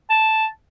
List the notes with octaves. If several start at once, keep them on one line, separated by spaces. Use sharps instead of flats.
A5